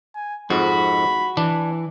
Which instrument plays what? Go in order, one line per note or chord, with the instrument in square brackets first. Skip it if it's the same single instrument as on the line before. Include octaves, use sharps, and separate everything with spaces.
[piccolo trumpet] G#5
[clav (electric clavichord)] F2 G#2 [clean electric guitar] F#4 [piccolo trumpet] B5
[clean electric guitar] E3 [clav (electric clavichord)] D4